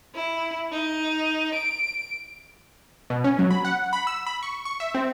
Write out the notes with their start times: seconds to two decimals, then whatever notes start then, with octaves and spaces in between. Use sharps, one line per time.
0.15 E4
0.72 D#4
1.54 D7
3.10 B2
3.24 C#4
3.39 F#3
3.51 B5
3.65 F#5
3.93 B5
4.07 E6
4.27 B5
4.43 C#6
4.65 C#6
4.80 E5
4.95 C4